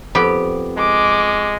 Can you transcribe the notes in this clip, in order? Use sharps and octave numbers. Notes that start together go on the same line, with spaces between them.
F2 B3 G4
G#3 D6